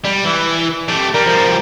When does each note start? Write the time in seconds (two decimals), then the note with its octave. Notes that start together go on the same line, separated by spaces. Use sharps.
0.05 G3
0.24 E3
0.88 A3 G4
1.14 G3 A#4
1.26 F3 G3